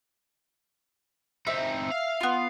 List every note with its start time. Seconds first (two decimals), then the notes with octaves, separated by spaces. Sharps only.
1.47 C4 D#4 E5
1.91 F5
2.21 B3 F4